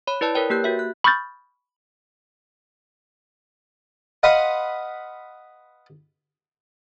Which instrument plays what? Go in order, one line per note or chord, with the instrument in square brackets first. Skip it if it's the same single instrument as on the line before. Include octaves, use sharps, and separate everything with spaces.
[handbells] C#5 B5
E4 B4 D5 A5
A#4 B4 C#5 G5
A#3 G4 F#6 G6
F#4 E5
F#6
B5 C#6 D#6 F6 G6 A6
[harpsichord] B4 D#5 F5 F#5 B5 C6